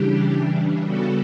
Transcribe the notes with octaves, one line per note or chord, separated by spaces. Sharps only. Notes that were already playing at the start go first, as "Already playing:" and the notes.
Already playing: C#3 E3 G3 D4 G4
C#3 G3 B3 F#4 A4